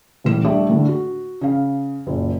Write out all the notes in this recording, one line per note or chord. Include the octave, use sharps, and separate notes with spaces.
D#1 A2 E3 E7
G3 A3 D4 A4 D5 E5
A2 D3
F#4
C#3 F5
F#1 A#2